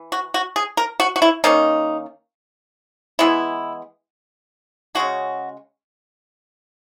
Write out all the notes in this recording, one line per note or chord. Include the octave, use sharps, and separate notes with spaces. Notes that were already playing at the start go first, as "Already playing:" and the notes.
Already playing: E3
F#4
F#4
G#4
A#4
F#4
F#4
E4
D#3 A#3 C#4 D#4
E3 G#3 B3 E4
C#3 G#3 C#4 F#4